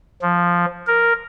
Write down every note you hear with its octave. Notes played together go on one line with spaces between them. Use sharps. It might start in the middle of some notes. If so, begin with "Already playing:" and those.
F3
A#4